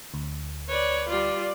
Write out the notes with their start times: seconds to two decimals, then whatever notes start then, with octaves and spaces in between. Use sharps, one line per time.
0.14 D2
0.68 B4 C#5 D5
1.09 G3 F4 D5